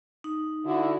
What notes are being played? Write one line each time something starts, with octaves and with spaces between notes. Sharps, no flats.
D#4
D3 E4 F#4